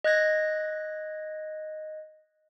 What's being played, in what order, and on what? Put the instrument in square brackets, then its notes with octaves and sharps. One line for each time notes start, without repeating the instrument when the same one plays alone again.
[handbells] D#5 F#6 G#6 A#6